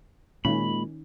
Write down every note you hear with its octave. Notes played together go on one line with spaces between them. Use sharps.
A#2 D#3 G#3 C#4 B5